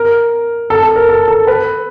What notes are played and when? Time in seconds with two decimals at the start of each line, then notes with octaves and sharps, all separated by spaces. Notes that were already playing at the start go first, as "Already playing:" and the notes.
Already playing: A#4
0.70 A4
0.83 A4
0.96 A#4
1.09 A4
1.28 A4
1.47 B4